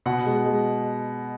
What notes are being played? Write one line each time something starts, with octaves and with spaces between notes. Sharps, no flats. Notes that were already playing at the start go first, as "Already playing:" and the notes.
B2 F#5
G#3
G#3